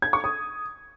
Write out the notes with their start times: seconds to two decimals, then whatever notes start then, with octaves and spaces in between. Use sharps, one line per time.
0.02 G#6
0.13 C#6
0.24 D#6